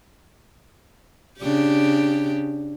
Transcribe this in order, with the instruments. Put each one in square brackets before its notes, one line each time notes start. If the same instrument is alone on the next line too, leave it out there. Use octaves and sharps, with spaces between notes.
[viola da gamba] C#3 D4 G4